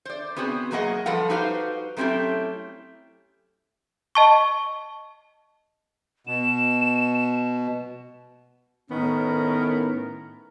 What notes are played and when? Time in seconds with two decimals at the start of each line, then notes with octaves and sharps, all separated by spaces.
0.05 C5 D5
0.36 B3 C4 F#4 G#4
0.71 E2 F#3 A#3 G#4 D#5 F#5
1.06 F3 G3 A4 B4 F5 F#5
1.30 D#4 F#4 G4 B4 C5 F5
1.97 F#3 A3 C4 C#4 E4 G4
4.15 D#5 A5 C#6
6.27 B2 E7
8.90 A2 D#3 B3 C#4 A#4